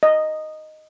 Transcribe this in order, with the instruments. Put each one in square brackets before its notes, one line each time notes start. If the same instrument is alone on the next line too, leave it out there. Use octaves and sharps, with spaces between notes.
[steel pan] D#5